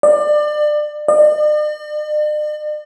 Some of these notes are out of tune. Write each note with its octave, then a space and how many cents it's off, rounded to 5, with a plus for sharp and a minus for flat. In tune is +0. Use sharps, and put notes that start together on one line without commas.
D5 +30
D5 +45